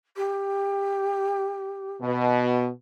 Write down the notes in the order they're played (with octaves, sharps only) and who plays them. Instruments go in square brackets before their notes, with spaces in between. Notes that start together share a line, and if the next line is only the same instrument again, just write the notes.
[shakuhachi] G4
[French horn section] B2